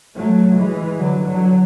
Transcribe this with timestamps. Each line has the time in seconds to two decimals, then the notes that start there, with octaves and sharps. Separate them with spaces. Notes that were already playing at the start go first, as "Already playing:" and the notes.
0.15 F#3 A3
0.57 E3 G#3
0.99 D3 F#3
1.28 D3 F#3